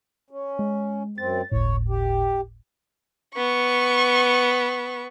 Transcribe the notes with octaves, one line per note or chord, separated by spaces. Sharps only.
C#4
G#3
F#2 C4 A6
G1 D2 A2 C#5
G4
B3 C#6